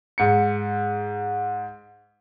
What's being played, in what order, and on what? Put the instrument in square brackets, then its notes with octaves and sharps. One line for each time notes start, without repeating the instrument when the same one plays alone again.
[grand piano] G#2 C#7